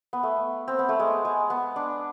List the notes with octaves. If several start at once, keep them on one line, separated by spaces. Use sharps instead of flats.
B3
A3
C4
B3
A3
G#3
G#3
B3
D4